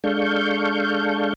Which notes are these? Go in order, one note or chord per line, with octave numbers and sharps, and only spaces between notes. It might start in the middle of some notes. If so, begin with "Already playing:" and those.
G#3 D4 A4 F5 C#6 G6